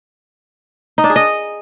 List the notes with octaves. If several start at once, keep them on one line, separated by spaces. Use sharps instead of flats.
D#4
D4
G#4
D#5